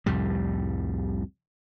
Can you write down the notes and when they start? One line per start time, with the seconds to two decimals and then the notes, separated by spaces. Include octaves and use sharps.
0.06 C2 F2 A2 G3